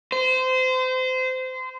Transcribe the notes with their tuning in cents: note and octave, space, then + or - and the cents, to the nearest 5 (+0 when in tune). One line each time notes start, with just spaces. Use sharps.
C5 -25